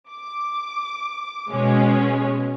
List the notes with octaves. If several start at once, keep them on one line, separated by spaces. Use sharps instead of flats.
D6
B2 G#3 C#4